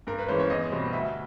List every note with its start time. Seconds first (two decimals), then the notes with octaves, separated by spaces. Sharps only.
0.07 G2 A#4
0.18 B4
0.28 E3 G#3 C#4 C5
0.39 C#5
0.50 E2 D#5
0.72 B2 G3 C4
0.93 D2 E5